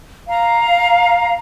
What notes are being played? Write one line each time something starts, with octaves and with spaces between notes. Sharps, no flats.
F5 A#5